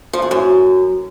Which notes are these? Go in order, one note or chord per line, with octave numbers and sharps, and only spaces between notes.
F3
E2
F#2